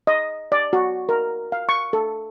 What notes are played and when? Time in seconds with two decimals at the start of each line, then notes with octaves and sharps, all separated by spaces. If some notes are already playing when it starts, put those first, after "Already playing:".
0.07 D#5
0.52 D5
0.73 F#4
1.09 A#4
1.52 F5
1.69 C#6
1.93 A4